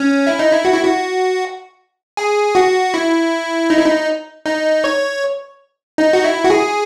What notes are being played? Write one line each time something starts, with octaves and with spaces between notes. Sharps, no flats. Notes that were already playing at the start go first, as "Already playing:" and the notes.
Already playing: C#4
E4
D#4
E4
F#4
E4
F#4
G#4
F#4
E4
D#4
E4
D#4
D#4
C#5
D#4
F#4
E4
F#4
G#4